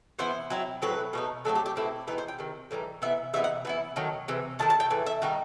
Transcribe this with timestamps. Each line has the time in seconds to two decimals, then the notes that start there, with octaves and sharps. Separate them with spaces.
0.19 E3 B3 E4 C5
0.50 F#3 C4 E4
0.82 A2 F#3 C4 B4
1.13 B2 A3 D#4
1.45 A2 F#3 A3 C4 A4
1.55 G4
1.66 G4
1.76 B2 A3 C4 E4 G4
2.07 E3 B3 D#4 B4
2.18 C5
2.28 G5
2.39 C3 D#3
2.71 A2 E3 G3 D#4
3.02 C3 E3 B3 E5
3.33 C3 E3 B3 D#4 E5
3.44 F#5
3.65 E3 B3 E4
3.96 D#3 F#3 A3
4.28 C3 E3
4.59 D#3 A3 E4 A5
4.70 A5
4.80 G5
4.90 A2 E3
5.06 E5
5.22 D#3 G3 D#4 F#4